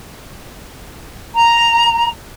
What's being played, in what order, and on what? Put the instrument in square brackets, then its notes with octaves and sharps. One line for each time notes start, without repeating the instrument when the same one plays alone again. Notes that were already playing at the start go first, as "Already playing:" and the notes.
[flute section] A#5